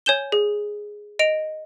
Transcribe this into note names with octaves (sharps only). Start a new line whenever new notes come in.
C#5 G#5 G6 E7 G7
G#4
D#5 D7 F7